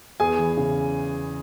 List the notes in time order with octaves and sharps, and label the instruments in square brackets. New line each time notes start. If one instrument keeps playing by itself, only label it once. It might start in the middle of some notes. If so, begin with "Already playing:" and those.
[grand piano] E2 G#4 G#5
E3
C#3